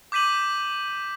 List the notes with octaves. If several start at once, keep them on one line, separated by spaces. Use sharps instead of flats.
D6 G6 B6 D#7 F#7